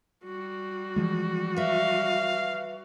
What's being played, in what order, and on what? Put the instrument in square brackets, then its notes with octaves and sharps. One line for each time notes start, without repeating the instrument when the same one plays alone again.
[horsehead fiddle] G3 F#4
[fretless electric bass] E3 F3 G#3
[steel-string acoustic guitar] B4 E5 [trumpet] F5